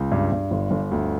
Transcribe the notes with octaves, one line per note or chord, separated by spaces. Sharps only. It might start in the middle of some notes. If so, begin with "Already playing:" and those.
Already playing: C#2
G2
G2
G1
G1
D2